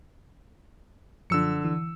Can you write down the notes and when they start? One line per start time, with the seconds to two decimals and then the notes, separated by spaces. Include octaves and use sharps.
1.30 F#2 D3 F3 E6 C#7
1.64 E3